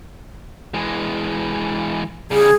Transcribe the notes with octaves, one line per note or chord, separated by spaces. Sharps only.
E3 G#3
C#3 G3 G#4